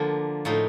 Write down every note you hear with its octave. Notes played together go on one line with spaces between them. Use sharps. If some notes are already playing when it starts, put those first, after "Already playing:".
Already playing: D3 F3 A#3 D4
A2 F3 A#3 D#4